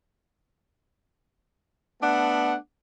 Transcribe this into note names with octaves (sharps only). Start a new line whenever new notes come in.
A3 B3 D4 F#5